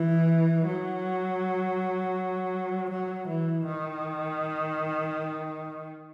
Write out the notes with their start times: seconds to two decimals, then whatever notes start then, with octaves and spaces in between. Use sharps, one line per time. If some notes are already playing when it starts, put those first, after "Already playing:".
Already playing: E3
0.66 F#3
2.90 F#3
3.28 E3
3.65 D#3